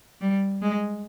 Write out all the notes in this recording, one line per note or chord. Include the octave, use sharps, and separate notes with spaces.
G3
G#3